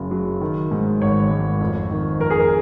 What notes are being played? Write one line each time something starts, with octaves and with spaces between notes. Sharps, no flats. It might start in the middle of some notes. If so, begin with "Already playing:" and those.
Already playing: F#1 C#3 F#3
F#3
D#3
G#2
G#1 C#5
G#2
F2
D#3
F2 A#4
G#4
A#4